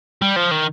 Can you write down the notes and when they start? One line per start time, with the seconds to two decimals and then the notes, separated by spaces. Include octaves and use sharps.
0.22 G3
0.36 F3
0.51 D#3